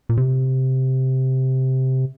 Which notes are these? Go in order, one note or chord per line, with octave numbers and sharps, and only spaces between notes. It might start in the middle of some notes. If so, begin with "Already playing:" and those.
A#2
C3